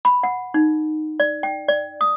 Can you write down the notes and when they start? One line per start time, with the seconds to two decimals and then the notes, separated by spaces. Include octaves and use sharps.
0.05 B5
0.23 F#5
0.54 D#4
1.20 D5
1.43 G5
1.68 D5
2.01 D#6